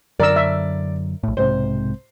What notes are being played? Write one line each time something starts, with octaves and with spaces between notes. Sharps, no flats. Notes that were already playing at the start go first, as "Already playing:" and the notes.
F#2 D3 A#4 D5 E6
E5
A#1 A2
B1 G#2 C3 C5